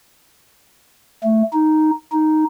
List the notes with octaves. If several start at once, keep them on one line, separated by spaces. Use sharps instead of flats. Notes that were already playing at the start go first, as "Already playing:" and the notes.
A3
D#4
D#4